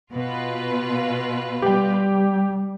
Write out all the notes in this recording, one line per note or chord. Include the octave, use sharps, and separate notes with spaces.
B2 F4 B4
G3 G4 G5